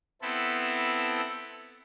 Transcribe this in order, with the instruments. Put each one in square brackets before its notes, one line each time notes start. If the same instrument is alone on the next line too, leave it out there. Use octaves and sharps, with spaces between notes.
[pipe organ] B3 C4 E4 A4